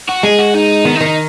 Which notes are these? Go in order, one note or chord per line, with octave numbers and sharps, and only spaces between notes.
F#4
G#3 G#4
F#4
D#4
D#3 B3
D#4
D#3
D#4